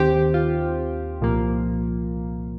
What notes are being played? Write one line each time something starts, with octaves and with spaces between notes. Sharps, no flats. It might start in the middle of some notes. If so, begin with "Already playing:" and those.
Already playing: D#2 D#3 C4 G4 C5
F4
C2 A#2 F3 A#3